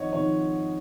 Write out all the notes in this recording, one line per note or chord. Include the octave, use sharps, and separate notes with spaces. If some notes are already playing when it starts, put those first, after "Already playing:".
Already playing: G#1 G#2 F3 C#5 D#5 F#5
G#1 G#2 F3 C#5